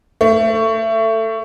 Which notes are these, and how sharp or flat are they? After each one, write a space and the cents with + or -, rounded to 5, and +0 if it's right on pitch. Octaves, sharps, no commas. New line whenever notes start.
A3 +20